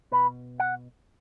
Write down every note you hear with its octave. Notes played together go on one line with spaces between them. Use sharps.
B2 B4
F#5